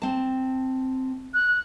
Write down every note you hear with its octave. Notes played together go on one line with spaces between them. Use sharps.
C4 A5
F#6